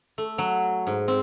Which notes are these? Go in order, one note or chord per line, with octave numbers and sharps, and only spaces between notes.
A3
F#3
G#2
C4